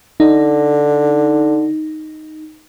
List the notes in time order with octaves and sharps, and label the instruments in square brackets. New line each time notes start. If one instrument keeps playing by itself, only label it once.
[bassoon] D3 [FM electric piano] D#4